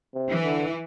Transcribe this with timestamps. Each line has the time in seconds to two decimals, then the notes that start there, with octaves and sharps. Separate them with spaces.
0.14 C3
0.30 E3
0.43 D3